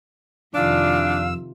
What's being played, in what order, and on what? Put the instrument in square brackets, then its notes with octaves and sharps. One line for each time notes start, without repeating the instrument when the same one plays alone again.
[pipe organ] F2 E6 [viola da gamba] C3 D#3 F4 [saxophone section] E3 D4 [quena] F5